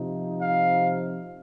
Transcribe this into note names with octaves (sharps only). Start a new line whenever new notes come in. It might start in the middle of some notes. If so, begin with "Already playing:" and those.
Already playing: C3 F3 D#4
F5